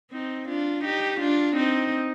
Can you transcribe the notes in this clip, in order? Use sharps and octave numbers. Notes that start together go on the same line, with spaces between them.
C4 D#4
D4 F4
D#4 G4
D4 F4
C4 D#4